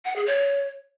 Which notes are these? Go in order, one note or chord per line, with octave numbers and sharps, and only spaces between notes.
F#5
G#4
C#5